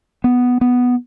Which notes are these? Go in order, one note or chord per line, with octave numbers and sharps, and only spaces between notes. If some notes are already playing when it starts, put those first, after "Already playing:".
B3
B3